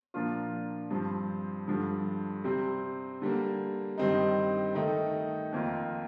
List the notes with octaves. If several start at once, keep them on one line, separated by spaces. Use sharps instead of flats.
A#2 F3 A#3 D4 F4
G2 F3 C4
G2 D3 F3
C3 G3 C4
D3 G3 A#3
G2 D#3 G3 C4 D#4
D#3 A3 D#4
F2 D#3 A#3 F4